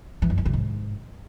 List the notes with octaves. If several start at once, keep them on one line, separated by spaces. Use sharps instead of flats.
E3
F#2
E3
C3
G#2